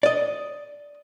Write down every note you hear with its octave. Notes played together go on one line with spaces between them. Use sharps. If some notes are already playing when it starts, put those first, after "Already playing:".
D5 D#5